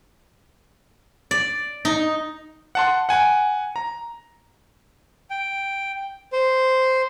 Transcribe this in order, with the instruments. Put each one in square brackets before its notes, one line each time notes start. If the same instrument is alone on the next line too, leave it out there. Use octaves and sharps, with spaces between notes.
[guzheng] D5
D#4
[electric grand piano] F#5 A5 C6
F#5 G#5
A#5
[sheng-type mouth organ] G5
C5